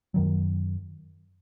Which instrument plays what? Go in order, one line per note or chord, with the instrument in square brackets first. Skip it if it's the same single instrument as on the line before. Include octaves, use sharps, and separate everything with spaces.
[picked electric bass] F#2 D#3 F#3